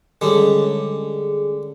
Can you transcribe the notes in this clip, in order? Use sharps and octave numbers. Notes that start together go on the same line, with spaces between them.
D3 G3 G#3 C#4 G#4